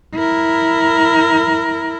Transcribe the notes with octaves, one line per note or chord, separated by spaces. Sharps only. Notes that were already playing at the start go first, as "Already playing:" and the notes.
E4 A#4